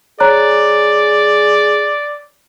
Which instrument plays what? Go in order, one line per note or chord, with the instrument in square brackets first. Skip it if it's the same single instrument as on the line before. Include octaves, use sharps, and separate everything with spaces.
[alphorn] G#4 [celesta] C#5 A#5 F#6 [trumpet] D5